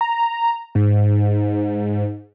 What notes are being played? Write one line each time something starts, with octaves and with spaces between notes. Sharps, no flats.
A#5
G#2